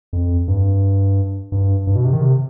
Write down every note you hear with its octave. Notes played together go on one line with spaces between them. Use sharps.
F2
G2
G2
G2
B2
C3
D#3
C3